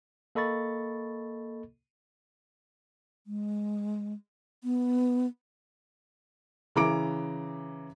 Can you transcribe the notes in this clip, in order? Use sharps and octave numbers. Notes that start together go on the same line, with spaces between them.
A#3 A4 D#5 B5 C#6 A6
G#3
B3
C#3 E3 A#5 D6 D7